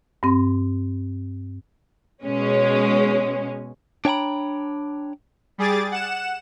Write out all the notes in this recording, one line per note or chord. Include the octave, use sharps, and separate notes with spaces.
G2 C4
B2 G#3 C#4
D4 C#5 G5 G#5 A#5 B5
G3 G#4 D6 A6
F#5 E7